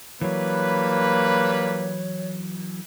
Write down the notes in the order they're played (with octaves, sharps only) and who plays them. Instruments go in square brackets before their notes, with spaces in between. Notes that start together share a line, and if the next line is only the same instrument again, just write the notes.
[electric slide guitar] E3 F#3 [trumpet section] G3 B4 [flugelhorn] A#3 [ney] C#5